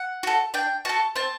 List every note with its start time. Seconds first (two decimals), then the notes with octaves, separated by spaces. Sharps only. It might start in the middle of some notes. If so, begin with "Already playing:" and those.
Already playing: F#5
0.23 F#4 A4
0.54 D4 G5
0.85 F#4 A4 A5
1.16 C4 A5